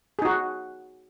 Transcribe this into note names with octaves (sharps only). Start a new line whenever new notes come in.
D#4 F#4 G#4